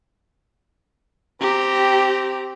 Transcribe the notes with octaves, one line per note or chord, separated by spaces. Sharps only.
C4 G4 A#5